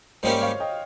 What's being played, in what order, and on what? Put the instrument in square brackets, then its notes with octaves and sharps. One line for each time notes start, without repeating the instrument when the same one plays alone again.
[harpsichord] G#2 G3 A#3 C#4 G4 [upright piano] C5 D#5
[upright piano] C#5 F5
D#5 G5